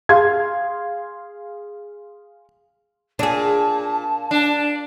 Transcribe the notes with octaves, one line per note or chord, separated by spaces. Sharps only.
G#4 F5 C6 G#6
A#2 D4 G#4 A5
D4